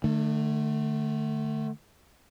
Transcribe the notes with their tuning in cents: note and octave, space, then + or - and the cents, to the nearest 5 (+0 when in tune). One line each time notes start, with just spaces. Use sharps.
D3 +40 A3 +0